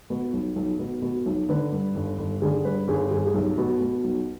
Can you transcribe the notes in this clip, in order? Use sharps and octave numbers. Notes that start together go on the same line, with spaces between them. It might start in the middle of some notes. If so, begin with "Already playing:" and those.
B2
B1
B1
B2
B2
B1
D3 B4
G2
G1
G1
D3 G#4
G2 B4
G1 G#4
G1 G#4
G#4
B1 G4
B2
B2
B1